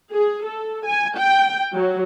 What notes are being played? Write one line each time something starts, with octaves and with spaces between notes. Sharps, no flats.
G#4
A4
G#5
G5
F#3